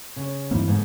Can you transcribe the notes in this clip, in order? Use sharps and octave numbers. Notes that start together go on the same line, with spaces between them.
C#3
G2 E3 A#3 C4 D#4 E4
G#2 D3 B3